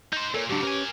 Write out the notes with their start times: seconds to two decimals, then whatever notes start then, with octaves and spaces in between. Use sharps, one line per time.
0.13 D#4 C5 G6
0.34 A#2 A4 A#4 C#5
0.49 G#2 C#3 F#3 D4 G4
0.63 C#4 A#4 B4 C#5 G#5